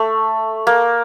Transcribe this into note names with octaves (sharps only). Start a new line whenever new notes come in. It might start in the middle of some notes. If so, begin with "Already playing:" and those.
Already playing: A3
A#3